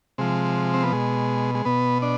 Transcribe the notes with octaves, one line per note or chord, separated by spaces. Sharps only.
C3 F3 G#3
C4
B3
B2 G#3
G#3
B2 B3
D4